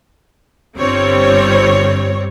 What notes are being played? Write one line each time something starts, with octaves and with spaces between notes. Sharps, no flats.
G1 G3 C4 C#5